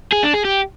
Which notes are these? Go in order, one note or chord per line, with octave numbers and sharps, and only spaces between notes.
G#4
D4
G#4
G4